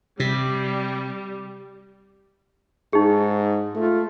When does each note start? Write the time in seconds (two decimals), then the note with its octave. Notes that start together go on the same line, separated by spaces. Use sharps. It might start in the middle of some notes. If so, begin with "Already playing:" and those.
0.20 C3 G3
2.93 G#2 D#4 G#4
3.75 A3 F4